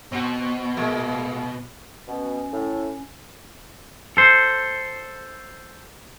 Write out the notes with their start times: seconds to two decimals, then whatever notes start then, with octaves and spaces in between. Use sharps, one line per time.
0.12 B2 C4 F#4
0.77 A2 G#3 A#3
2.08 B2 C#4
2.52 A2
4.17 A4 C5